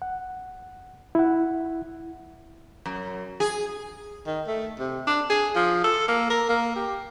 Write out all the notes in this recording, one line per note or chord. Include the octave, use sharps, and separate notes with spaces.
F#5
E4 F#5
F#2
G#4
D#3
A3
C3
D4
G#4
F3
A4
A#3
A#4
A#3
G4